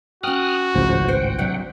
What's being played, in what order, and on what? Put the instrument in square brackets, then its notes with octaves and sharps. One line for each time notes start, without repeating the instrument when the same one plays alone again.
[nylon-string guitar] C#4 G5 [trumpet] F#4 [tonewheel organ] D#6 F6 F#6
[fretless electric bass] G#1 C#2 A2 [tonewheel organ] C#3 F3 C5
[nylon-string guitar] C5 [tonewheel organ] F#5 G5
[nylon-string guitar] C3 F#3 D4